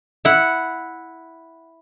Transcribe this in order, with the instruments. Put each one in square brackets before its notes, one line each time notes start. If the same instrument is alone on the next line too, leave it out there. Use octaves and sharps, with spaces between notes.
[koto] E4 F#5